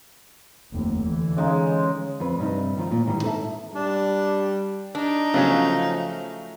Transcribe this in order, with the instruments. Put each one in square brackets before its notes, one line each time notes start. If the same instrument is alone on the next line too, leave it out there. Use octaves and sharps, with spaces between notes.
[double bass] F1 D#2
D3 E3
[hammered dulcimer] C#3 G#3 D#4
[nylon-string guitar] F2 B4
G2 C3 D#4
D#3 F3 F4
A#2
G#2 D#3 E3 G3
D#4 A4 C5 E5 A5
[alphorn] G3 [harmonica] D4
[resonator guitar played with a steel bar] D4 [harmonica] D#4
[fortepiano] C#3 F#3 C#4 [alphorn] F3 [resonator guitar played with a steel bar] A3